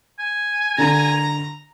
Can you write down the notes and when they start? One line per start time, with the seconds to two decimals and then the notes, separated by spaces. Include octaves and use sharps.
0.19 G#5
0.78 D3 A#5